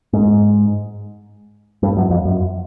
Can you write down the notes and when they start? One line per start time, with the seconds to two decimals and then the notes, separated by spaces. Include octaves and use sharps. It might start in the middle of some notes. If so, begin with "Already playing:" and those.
0.13 G#2
1.83 G2
1.97 F#2
2.10 F2
2.25 F#2